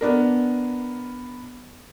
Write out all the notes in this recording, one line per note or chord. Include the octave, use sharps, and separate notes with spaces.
B3 D4 A#4